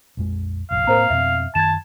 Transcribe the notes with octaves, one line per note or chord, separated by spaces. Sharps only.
A#1 F2 G#3
F1 A#1 F5
A2 A#3 C4 A#4 C5 A#5
F2 B2 C4 E5
F#2 D#3 A5 G#6 E7